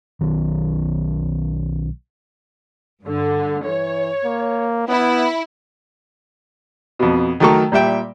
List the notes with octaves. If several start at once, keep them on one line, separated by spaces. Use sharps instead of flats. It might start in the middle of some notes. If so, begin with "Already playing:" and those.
B1 D#3
G2 D3
E3 C#5
A#3
B3 E4
F2 B2
D#3 F#3 A3 A4 A#4 C#6
A#2 G3 E5 G5